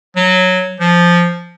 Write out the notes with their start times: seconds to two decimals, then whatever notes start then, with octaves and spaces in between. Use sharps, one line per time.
0.16 F#3
0.80 F3